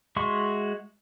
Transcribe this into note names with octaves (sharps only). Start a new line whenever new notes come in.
G#3 F#4 E5 C6 C#6